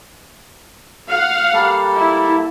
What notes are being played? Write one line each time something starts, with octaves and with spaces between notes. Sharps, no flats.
F5 F#5
G3 A#3 A4
E4